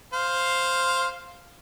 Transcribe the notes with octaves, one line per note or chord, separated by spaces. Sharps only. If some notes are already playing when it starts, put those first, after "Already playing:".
C5 F5